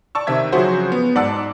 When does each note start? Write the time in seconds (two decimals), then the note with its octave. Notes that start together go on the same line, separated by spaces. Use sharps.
0.15 D5 A5 C#6 E6
0.27 C3 D#3 C4 E5 G#6
0.52 C#3 F3 F#3 F#4 G#4 C5
0.92 B3
1.15 G#2 D5 F#5 A5 E6